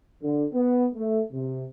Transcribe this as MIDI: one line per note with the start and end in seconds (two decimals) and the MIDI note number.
0.23 0.45 50
0.53 0.85 59
0.95 1.20 57
1.33 1.64 48